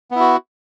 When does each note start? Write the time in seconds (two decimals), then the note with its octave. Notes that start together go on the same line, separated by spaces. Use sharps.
0.11 B3
0.16 E4
0.20 F#4